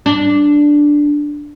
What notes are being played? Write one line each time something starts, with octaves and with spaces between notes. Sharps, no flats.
D4